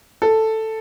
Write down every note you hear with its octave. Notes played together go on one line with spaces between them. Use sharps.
A4